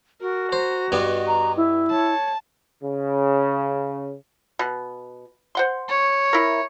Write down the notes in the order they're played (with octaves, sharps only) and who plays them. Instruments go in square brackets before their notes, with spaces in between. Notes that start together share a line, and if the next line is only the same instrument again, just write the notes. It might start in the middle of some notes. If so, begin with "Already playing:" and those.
[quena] F#4 [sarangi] A#4
[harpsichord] C5 [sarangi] A#5
[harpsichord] G2 G3 B3 [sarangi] D#5
[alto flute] A#5
E4
[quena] C#5 [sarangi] A5
[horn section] C#3
[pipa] B2
C5 F#5 C6
[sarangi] C#5
[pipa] E4 A#4